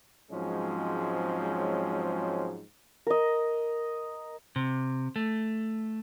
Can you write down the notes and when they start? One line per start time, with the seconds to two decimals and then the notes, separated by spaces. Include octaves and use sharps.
0.31 G#2 F3 F#3 G#3 C4 C#4
3.07 A#4 D#5
4.56 C3
5.16 A3